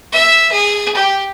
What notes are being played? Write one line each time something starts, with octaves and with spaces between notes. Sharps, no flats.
E5
G#4
G4